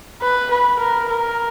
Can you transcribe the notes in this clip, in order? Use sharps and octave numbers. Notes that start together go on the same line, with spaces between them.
B4
B4
A#4
A#4